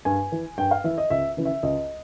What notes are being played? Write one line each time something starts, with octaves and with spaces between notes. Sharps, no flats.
G2 G#5
E3
G2 G5
F5
E3 E5
D#5
C#2 E5
C#3 E3
E5
C#2 D#5